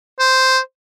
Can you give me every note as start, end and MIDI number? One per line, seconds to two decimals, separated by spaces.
0.20 0.59 72